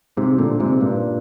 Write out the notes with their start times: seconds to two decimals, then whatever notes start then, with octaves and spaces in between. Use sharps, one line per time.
0.17 G#2 C3
0.38 A#2 D3
0.60 G#2 C3
0.80 G2 A#2